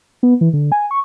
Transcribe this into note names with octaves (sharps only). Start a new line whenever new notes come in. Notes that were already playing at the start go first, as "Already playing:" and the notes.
B3
E3
D3
G#5
C#6